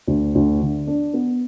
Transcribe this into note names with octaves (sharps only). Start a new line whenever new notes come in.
D2
D2
D3
D4
B3